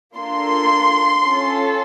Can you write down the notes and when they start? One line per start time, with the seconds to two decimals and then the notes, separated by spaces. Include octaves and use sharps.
0.16 A#3 D4 F4 A4 C6
1.24 C#4 F4 A4